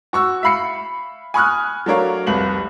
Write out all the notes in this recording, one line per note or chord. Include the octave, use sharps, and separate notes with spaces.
F#4 C#6 E6
E5 F5 B5 C7 C#7
G#5 B5 C#6 D#6 F6 F#6
F#3 A3 D4 A#4 C#5 F5
F1 C2 B4 F5 F#7